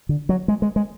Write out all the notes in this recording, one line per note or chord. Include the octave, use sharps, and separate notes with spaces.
D3
F#3
G#3
G#3
G#3